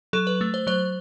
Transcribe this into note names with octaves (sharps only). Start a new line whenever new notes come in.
F#3 A4
B4
A3
C5
F#3 C5